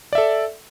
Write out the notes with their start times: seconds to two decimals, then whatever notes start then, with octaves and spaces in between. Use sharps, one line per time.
0.13 D5
0.15 E5
0.18 A4